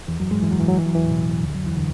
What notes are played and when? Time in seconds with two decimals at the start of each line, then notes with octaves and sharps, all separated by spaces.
0.08 E2 E3
0.20 F#2 F#3
0.31 G#2 G#3
0.42 E3
0.52 F#3
0.59 E3
0.68 F#3
0.78 E3
0.86 F#3
0.95 E2 E3
1.04 A2
1.09 B2
1.43 D2 D3
1.54 F#2 F#3
1.66 E2 E3
1.77 D3